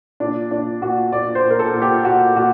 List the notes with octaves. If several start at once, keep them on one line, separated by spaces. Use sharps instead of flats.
A#2 D4
A#2 D4
A#2 F#4
A#2 D5
C5
A#2
A#4
A4
A#2
G4
A#2 F#4
A#2 F#4